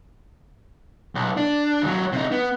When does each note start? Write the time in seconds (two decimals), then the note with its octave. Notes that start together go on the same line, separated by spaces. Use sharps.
1.15 B1
1.37 D4
1.82 D#2 F#3
2.13 C3 D#4
2.32 B3